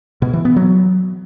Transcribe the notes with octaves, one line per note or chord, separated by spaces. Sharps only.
B2
E3
B3
F#3